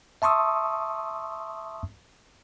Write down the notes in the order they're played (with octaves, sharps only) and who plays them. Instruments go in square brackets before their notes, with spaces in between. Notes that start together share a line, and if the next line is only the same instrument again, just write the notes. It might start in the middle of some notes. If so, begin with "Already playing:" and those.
[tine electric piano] E5 A5 C6 C#6 D#6 E6